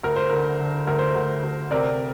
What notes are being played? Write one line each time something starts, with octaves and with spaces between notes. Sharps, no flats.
D2 A#4
C5
D3 A#4
D3
D2 A#4
C5
D2 A#4
D2
C3 A#4 D5